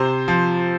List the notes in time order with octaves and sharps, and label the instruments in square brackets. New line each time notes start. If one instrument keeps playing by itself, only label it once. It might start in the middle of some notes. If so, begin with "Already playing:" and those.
Already playing: [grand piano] C3 C5
F3